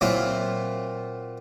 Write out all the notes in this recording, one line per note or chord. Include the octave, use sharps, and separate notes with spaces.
A#2 F#3 C4 E4 F4